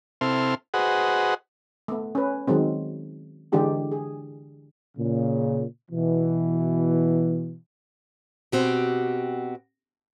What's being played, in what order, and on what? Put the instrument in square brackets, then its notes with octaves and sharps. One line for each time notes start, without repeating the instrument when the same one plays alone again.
[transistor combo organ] C3 C4 E4 A4 C6 F6
F#4 G#4 B4 C5 D#5 F#5
[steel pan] A3 B3
C#4 B4
D#3 F#3 G#3 C4
D3 E3 G#3 D4 G4 G#4
G#4
[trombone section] A#2 C#3
B2 E3
[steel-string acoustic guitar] B2 C4 F#4 G4